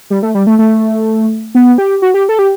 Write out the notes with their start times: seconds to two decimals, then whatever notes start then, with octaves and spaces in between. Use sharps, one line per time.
0.10 G3
0.23 A3
0.35 G3
0.47 A3
0.59 A3
1.55 B3
1.78 G4
2.02 F#4
2.14 G4
2.29 A4
2.39 G4